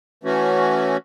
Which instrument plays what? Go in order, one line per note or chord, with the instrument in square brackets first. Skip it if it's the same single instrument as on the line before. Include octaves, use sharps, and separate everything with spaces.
[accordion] E3 A3 C#4 F#4